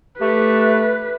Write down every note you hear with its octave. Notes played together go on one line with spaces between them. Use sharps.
A3 G4 B4